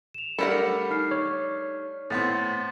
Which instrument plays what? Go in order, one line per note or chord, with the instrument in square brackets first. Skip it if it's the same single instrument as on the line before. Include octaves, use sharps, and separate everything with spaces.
[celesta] E7 F7
[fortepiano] G3 A3 D4 [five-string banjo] A4 A#4 F#5 [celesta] B5
[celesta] D#4 F6 C7
[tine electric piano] C#5
[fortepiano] A2 B3 C4 [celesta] A6